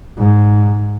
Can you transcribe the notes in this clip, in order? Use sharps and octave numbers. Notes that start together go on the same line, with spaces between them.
G#2